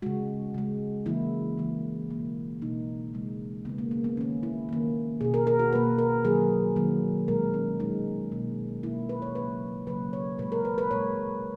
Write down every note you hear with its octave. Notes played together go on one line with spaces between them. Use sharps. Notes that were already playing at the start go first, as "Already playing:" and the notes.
C#3 G#3 F#4
C#3 G#3
C#3 E3 A#3 E4
C#3 E3 A#3
B2 A#3
B2 A#3 D#4
C#3 G#3
C#3 G#3 B3
A#3
A#3
B3
D#3 A#3 C#4
E4
D#3 A#3
B2 A#3 G#4
A#4
A#4
F#4
B2 A#3 B4
A#4
D#3 F#3 A#3 G#4
D#3 F#3 A#3
A#2 G#3 A#4
C#4
A#2 G#3 D#4
B2 A#3
B2 A#3 E4
B4
C#5
C#3 F#3 A#3 B4
C#3 F#3 A#3 B4
C#5
A#2 G#3 B4
A#4
B4
B4
A#2 G#3 C#5